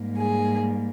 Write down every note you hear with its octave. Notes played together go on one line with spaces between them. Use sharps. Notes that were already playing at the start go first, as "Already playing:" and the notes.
Already playing: G#2 G3 A#3
G#4